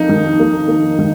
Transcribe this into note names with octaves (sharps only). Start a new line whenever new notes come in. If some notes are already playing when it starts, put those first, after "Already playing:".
Already playing: F2 A#3 D#4
D#3
A#3
A#3
D#3